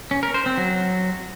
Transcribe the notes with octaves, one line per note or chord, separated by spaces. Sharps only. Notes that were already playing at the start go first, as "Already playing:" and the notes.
C#4
A#4
C5
C4
F#3